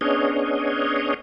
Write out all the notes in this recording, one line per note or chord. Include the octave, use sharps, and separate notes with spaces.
B3 C#4 D4 G#4 C#5 D#5